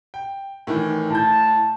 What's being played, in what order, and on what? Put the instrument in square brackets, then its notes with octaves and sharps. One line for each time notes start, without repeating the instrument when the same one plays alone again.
[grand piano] G5
A2 D#3 E3
[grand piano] A2 G6 [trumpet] A5